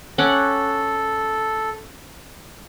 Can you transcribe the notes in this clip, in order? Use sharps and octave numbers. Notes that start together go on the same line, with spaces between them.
C#4 A4 F#5 D6